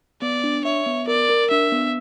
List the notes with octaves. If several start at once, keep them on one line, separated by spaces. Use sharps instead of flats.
B3 D5
D4
C#5 E5
B3
A#4 D5
A#4
D4 E5
B3